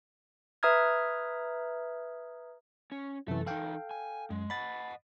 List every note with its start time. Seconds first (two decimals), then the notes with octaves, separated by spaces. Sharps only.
0.63 B4 E5 A#5 D#6 F6 G#6
2.92 C#4
3.28 F#2 C3 E3 A4 E5
3.46 E3 D#4 A4 F5 G5
3.91 G#5
4.30 F#2 G#3
4.50 D#5 F#5 B5 A6